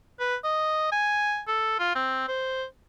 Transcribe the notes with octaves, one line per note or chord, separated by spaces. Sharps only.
B4
D#5
G#5
A4
F4
C4
C5